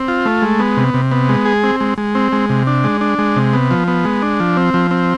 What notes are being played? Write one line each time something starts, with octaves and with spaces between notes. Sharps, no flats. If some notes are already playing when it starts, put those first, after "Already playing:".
Already playing: C4
F4
A3
G#3
B3
C3
C3
B3
G#3
G#4
C4
G#3
G#3
C4
G#3
C3
D4
G#3
D4
G#3
C3
B3
F3
B3
G#3
D4
F3
C4
F3
C4